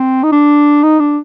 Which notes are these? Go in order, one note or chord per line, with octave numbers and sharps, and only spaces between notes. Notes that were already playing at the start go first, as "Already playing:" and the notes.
Already playing: C4
D#4
D4
D#4
D4